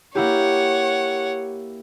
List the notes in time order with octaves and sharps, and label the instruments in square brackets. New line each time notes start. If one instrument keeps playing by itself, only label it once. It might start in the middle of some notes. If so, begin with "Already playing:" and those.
[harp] A#3 E4 G4 [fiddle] C#5 F#5